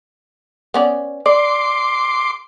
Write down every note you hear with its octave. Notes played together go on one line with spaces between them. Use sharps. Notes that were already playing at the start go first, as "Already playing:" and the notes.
B3 C#4 D5
D5 C6 D6